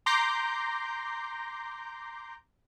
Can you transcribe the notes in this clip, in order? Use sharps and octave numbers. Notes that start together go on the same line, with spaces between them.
A#5 C6 D6 G6 A#6 C7